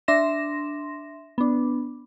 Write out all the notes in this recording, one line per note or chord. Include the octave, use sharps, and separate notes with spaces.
D4 E5 C6 A#6 E7
B3 D4